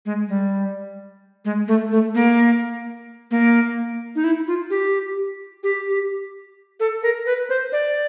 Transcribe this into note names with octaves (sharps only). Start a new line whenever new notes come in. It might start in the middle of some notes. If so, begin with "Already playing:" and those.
G#3
G3
G#3
A3
A3
A#3
A#3
D#4
E4
F4
G4
G4
A4
A#4
B4
C5
D5